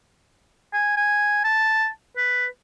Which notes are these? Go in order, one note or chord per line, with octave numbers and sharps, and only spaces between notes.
G#5
G#5
A5
B4